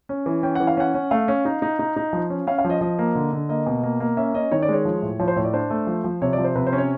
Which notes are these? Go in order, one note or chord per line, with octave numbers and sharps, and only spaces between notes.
C#4
E3
C#4 G5
E3 F#5
F5
C#4 F#5
C#4
A3 F5
C#4
D#4
D#4
D#4
D#4
F3
C#4
C#4 F5
F5
F3
D#5
F3 D#5
A#3
D3
D3
A#3 D#5
B2
A#3
A#3
C#4 E5
C#4 D#5
D#3 C#5
D5
G#3 C#5
F3
A2
F3 C#5
C5
A2 C#5
D5
D4 C5
A3
F3
F3
C3 C#5
D5
F3
C5
C3 B4
C5
C#4
C#5